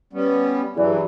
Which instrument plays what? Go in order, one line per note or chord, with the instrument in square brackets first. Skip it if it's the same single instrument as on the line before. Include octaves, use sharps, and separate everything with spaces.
[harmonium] G3 B3 C#4
[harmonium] G2 F#3 [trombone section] E3 [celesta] G#4 D5